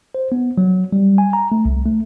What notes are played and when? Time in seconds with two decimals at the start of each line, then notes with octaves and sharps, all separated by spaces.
0.15 C5
0.32 B3
0.58 F#3
0.92 G3
1.18 G#5
1.33 A#5
1.52 A3
1.65 C2
1.85 A3